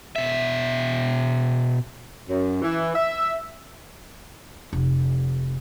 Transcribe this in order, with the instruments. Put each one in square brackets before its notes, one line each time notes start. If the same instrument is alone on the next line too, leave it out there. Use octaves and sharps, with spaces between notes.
[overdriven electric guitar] B2 E5
[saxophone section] F#2
E3
E5
[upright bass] F1